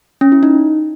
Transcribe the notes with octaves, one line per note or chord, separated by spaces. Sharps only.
C#4
E4
D#4